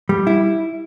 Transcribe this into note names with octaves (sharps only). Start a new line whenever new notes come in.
G3
E4